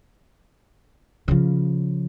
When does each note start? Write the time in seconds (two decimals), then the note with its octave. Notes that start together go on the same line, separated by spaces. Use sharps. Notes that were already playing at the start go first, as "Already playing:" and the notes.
1.28 C#3 F3